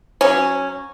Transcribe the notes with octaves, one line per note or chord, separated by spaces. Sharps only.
F#3 C#4